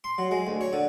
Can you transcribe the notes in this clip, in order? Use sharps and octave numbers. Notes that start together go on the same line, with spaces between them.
C6
F#3
G#3
D2
C#5
D3